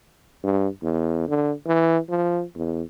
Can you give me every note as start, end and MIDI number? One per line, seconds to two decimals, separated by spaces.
0.44 0.67 43
0.82 1.24 40
1.28 1.52 50
1.66 1.98 52
2.09 2.43 53
2.55 2.82 40